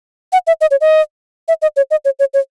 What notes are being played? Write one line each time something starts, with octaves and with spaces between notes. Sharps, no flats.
F#5
E5
D#5
C#5
D#5
E5
D#5
C#5
D#5
C#5
C#5
C#5